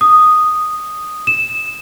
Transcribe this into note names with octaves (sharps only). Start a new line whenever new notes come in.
D#6
E7